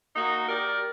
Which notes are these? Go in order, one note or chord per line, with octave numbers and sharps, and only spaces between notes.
A#3 D#4 F#4
G4 A#4 D5